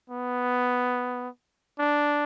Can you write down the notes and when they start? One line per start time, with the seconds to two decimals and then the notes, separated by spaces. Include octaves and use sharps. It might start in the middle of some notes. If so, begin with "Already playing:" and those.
0.10 B3
1.79 D4